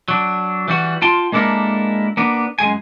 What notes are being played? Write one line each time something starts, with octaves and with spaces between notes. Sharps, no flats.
F#3 D4
E3 G3 F#4
F4 G5 A5 C6
G#3 A#3 D4 E4 A4 A#4
A#3 B3 D4
F#2 G#3 G#4 G#5